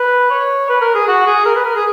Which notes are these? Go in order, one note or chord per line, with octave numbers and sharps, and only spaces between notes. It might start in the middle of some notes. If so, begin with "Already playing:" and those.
Already playing: B4
C#5
B4
A#4
G#4
F#4
G#4
A#4
B4
A#4
G#4